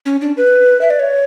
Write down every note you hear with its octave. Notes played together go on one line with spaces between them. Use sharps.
C#4
D4
B4
E5
D5
C#5